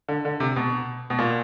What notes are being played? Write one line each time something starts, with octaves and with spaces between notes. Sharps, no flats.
D3
D3
C3
B2
B2
A#2